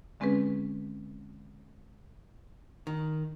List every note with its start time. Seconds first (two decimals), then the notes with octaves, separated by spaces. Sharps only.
0.20 D3 G#3 C4 C#4 G#4 B4
2.87 D#3